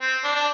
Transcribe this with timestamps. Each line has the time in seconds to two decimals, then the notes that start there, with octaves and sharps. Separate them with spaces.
0.01 C4
0.24 D4
0.35 D4